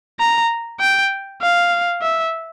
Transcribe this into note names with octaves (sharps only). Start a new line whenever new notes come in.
A#5
G5
F5
E5